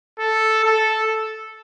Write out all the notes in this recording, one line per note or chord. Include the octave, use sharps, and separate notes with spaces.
A4
A4